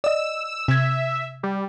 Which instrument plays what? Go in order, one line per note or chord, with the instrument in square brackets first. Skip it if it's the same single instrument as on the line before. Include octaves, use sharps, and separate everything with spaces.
[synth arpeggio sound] D5 D#5 [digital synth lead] E6
[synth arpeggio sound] C3 G#6 [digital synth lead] E5
[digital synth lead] G3